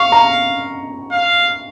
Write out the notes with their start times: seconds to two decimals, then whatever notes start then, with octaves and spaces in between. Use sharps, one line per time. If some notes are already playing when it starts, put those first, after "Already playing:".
Already playing: F5 C#6
0.12 A#5
1.12 F5